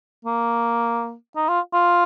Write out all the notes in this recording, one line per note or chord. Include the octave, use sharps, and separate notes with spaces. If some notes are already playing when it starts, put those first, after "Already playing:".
A#3
D#4
F4
F4